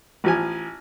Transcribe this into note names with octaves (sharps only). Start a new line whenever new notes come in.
A1 F3 G#5